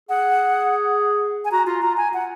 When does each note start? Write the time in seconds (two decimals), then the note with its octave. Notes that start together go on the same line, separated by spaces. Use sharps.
0.09 G#4 F#5
1.45 G#5
1.51 F#4 A#5
1.66 F4 A#5
1.82 F4 A#5
1.97 G#5
2.14 F#5